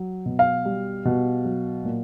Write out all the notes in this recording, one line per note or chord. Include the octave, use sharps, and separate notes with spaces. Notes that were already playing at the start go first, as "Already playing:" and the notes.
Already playing: F#3
B2
F5
G3
B2
F#3
A#2